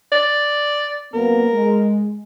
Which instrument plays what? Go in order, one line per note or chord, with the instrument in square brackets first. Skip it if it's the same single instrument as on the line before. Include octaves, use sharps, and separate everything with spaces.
[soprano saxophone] D5
[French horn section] F#2 A#3 B3 [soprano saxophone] A#4
[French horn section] G#3